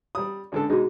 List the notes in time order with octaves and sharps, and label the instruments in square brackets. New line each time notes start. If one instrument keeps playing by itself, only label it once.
[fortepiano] G3 D#6
C#2 D3 A4
[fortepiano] B2 G#3 D#4 [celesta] F#4 G#4